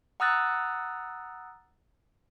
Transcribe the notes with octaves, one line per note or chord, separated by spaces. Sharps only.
F#5 A#5 D#6 E6 F#6 A6